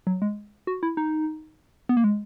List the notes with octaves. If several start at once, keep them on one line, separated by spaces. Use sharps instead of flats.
F#3
G#3
F#4
E4
D#4
B3
A#3
G#3